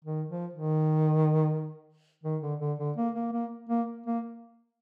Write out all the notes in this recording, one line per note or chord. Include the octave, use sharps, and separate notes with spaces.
D#3
F3
D#3
D#3
D3
D3
D3
A#3
A#3
A#3
A#3
A#3